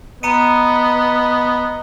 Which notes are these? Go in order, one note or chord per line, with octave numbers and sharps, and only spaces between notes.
B3 D#5 A#5 C#7 D#7